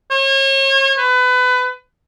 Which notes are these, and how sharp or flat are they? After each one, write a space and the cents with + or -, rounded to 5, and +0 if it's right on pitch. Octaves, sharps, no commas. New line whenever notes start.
C#5 -40
B4 +25